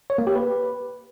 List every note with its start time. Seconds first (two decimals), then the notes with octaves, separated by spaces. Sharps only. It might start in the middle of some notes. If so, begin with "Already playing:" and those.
0.10 C#5
0.18 A#3
0.27 G4
0.35 B4